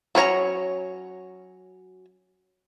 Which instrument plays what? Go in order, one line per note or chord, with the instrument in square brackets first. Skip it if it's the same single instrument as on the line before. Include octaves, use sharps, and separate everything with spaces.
[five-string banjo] F#3 C#4 C#5 A#5